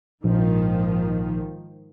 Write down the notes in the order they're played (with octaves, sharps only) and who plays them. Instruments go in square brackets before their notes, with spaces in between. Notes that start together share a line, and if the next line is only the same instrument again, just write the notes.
[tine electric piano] A#1 [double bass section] G#2 D#3 F3